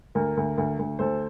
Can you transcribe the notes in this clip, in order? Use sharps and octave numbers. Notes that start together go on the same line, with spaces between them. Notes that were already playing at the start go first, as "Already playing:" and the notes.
D2 A#4
D2
D2
D2
D2 A4 C5